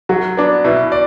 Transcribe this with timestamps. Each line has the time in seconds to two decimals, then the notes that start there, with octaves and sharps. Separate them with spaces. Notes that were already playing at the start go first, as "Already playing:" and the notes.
0.09 F#3 F#4
0.37 B3 D4
0.64 B2 E4
0.92 D5